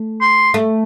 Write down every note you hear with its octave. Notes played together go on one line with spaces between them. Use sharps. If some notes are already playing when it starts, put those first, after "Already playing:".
Already playing: A3
C6
A3